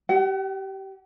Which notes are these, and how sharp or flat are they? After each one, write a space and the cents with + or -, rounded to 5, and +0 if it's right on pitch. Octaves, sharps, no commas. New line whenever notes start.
G4 -25 F#5 +35